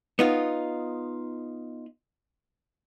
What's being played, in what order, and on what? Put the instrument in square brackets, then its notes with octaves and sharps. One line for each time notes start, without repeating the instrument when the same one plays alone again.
[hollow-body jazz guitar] B3 D#4 F4